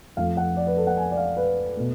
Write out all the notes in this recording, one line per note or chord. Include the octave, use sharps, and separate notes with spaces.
F2 F3 A3 F5
F#5
D5
B4
A4
F#5
G#5
D5
F5
B4
B2 A3